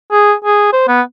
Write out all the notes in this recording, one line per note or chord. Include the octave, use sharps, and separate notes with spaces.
G#4
G#4
C5
B3